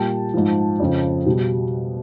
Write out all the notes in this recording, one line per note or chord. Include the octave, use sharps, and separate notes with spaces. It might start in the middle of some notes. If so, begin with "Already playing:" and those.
Already playing: A#2 G3 G5 A5
G#2 F3
F2 C#3 F3
B2 G3